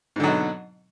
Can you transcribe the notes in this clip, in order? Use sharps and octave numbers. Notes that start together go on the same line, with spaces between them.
G#2 B2 D3 F#3